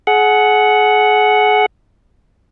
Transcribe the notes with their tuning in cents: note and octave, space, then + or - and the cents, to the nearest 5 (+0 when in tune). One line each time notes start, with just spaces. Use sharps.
G#4 +35 F#5 +0